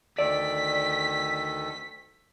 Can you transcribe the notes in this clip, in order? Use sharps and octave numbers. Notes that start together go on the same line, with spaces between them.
D2 D#3 A4 D5 B6